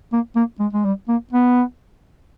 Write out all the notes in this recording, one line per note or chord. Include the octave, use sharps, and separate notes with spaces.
A#3
A#3
G#3
G#3
G3
A#3
B3